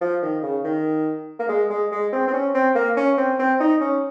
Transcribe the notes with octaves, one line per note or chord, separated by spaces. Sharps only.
F3
D#3
C#3
D#3
A#3
G#3
G#3
G#3
C4
C4
C#4
C4
A#3
C#4
C4
C4
D#4
C#4